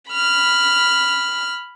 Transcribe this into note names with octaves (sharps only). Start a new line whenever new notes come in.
B5 F6